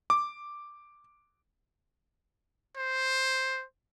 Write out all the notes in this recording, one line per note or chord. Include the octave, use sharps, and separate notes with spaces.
D6
C5